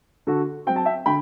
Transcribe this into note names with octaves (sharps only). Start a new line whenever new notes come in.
D3 F#4 A4
F#3 C4 G5
A5
E5 G5
D3 G5 B5